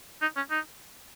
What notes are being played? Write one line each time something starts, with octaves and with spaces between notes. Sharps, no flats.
D#4
C#4
D#4